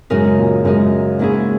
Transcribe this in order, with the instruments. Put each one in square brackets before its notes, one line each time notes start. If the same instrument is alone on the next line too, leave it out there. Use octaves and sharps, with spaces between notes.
[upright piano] F#2 [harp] C#3 G#3 D#4 A#4
[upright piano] A#2
[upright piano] F#2 [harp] C#3 G#3 D#4 A#4
[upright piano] G#2 [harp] F#3 A#3 C#4 E4 G#4